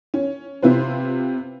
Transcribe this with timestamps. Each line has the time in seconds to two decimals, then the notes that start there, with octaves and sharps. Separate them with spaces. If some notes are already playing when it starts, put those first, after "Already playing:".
0.14 C#4
0.62 C3 E4 F4 B4 C5